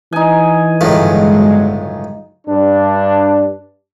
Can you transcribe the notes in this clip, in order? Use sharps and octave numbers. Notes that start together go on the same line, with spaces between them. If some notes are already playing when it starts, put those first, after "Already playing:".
E3 D#4 G#5
G1 C#2 A2 D#3 F#3 G#3
G2 D4